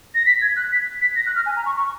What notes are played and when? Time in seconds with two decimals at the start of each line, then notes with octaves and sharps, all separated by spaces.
0.15 A#6
0.26 B6
0.41 G#6
0.56 F#6
0.72 B6
1.01 B6
1.16 A#6
1.26 F#6
1.36 F6
1.46 G#5
1.56 A#5
1.66 C#6
1.76 C#6